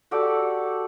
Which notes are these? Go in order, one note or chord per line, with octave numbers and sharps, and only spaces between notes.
F#4 G4 A4 D5